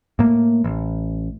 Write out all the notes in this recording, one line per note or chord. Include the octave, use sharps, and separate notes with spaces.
A2 A#3
A1